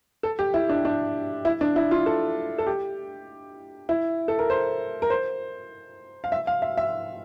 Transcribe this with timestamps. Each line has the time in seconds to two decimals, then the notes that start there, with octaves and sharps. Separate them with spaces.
0.23 A4
0.39 G4
0.54 E4
0.69 D4
0.85 D4
1.45 E4
1.61 D4
1.76 E4
1.91 F4
2.06 A4
2.58 A4
2.67 G4
3.89 E4
4.28 A4
4.39 A#4
4.50 C5
5.02 A#4
5.10 C5
6.24 F5
6.32 E5
6.47 F5
6.62 E5
6.77 E5